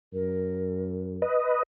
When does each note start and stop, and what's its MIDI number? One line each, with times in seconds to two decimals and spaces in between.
0.13 1.23 42
0.13 1.23 70
1.22 1.63 71
1.22 1.63 75